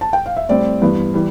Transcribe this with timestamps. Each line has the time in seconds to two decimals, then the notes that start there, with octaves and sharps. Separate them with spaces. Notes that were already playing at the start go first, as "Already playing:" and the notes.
0.01 A5
0.13 G5
0.26 F5
0.37 E5
0.49 A2 G3 C4 D5
0.82 G2 E3 B3
1.14 E3 G3